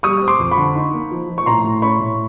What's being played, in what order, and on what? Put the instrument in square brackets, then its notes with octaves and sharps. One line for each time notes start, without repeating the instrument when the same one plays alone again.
[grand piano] G3 C#6 D#6
C4
C6 D6
F2
B5 C#6
D3
D#4
A#3
F3
F3
C#6
A2 A#5 C6
A2
C#4 B5 C#6
A2